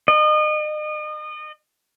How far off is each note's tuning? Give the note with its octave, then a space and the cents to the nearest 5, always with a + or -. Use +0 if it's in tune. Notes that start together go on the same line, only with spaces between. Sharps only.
D#5 -35